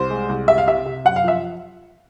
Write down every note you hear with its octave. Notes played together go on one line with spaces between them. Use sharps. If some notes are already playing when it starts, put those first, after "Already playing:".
Already playing: C2 C5
G#3
C2
C3 E5
F5
C3 E5
C3
F#2 F#5
F5
F3 E5